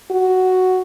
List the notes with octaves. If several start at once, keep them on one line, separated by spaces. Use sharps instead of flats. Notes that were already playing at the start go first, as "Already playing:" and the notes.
F#4